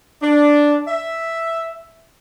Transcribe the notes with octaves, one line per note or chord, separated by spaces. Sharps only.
D4
E5